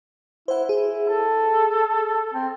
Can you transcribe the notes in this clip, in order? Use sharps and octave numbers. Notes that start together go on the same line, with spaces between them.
E4 C5 F#5
E4 G#4
A4
C4